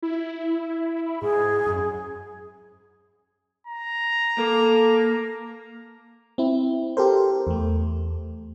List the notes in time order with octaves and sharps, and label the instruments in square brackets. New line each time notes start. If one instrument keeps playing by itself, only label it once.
[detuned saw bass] E4
[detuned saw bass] G#2 [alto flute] G#4
[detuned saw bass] F#2
[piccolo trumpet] A#5
[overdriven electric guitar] A#3 [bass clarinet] A4
[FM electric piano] C4 E4
G4 A4 A#4 C5
E2 A3